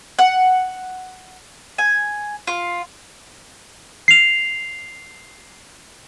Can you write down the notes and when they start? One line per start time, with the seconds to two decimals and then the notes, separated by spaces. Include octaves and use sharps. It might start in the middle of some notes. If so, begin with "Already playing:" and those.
0.19 F#5
1.78 G#5
2.47 F4
4.08 C7 F7